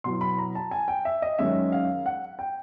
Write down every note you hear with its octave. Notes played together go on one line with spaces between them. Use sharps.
B2 F#3 B3 E4 C6
B5
A#5
A5
G#5
G5
E5
D#5
F#2 D#3 G#3 C#4 E5
F5
F#5
G5